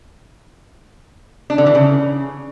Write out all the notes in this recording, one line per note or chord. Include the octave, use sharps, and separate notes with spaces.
D4
D3
E3
C#3